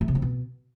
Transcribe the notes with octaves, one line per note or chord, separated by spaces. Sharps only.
A3
C3
C4
B2